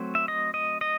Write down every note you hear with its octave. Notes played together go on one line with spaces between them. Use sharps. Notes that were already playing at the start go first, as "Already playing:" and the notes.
Already playing: F#3 A3 C4
E5
D#5
D#5
D#5